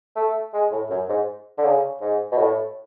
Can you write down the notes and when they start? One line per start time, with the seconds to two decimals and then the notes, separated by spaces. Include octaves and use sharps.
0.16 A3
0.53 G#3
0.72 A2
0.90 F#2
1.09 G#2
1.58 D3
1.64 C#3
2.01 G#2
2.32 B2
2.38 A2